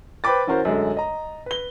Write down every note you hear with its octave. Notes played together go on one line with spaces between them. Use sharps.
B4 C5 G5 B5 D6 A6
E3 C#4 F#4 A#4 C5
F#2 D3 G#3 A3
D#5 A#5
B4 G7